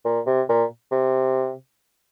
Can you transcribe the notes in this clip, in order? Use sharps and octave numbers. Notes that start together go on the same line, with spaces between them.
A#2
C3
A#2
C3